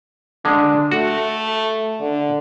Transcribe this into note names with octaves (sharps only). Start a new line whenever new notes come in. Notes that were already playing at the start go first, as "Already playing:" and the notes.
D3 G#3 D4
A3 F#4
D3